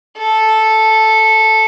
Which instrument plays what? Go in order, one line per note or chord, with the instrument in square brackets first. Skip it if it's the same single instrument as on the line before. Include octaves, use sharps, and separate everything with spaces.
[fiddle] A4